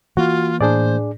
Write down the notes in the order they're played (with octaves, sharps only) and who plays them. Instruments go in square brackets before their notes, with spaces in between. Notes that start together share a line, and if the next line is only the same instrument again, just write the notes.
[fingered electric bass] E3 A#3 [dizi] F4 [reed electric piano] F#4
[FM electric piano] A2 [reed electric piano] D4 G#4 D5 [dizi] C5